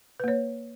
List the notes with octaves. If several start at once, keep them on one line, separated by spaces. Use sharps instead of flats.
A#3 B4 C#5